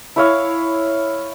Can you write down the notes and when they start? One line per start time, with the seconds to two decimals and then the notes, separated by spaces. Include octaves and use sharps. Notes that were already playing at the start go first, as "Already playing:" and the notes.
0.16 E4 C#5 F5